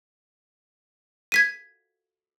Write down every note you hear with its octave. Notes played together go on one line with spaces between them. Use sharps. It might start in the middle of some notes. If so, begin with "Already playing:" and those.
G#6 B6 D#7